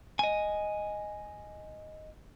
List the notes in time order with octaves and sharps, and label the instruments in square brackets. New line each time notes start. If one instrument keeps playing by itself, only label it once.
[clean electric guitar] D#5 G#5